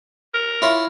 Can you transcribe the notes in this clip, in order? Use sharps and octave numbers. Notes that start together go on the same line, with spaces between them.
A#4
E4 F4 C#5